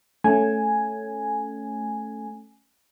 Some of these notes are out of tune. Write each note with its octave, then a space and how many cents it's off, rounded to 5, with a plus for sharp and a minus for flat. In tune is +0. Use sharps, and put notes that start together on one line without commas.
A3 +0 C#4 +0 G#5 +0